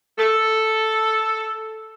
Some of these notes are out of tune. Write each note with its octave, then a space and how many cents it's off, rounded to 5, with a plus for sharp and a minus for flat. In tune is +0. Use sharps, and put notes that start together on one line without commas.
A4 +0